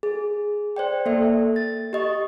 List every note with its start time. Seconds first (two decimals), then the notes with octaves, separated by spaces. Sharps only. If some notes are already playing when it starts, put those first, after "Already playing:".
0.03 G#4
0.76 C5 D5 G5
1.06 A#3 A4 D5 E5
1.56 A6
1.93 G4 D#5 C#6